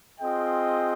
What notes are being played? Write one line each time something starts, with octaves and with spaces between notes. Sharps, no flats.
C4 F4 G#4 D#5 G5